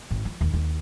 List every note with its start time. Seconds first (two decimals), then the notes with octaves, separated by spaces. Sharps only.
0.11 G#1
0.25 F3
0.41 D#2
0.54 D#2